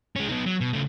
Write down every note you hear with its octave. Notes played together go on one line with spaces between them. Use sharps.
G#3 C#4
B3 D#4
F#3
B2
C#3 A3